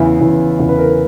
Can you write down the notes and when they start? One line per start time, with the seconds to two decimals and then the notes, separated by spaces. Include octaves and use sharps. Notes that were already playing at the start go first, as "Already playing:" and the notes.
Already playing: E2 C#3 E3 E4
0.20 E2 C#3 E3
0.59 E2 C#3 E3
0.69 B4
0.78 A#4
0.89 A#4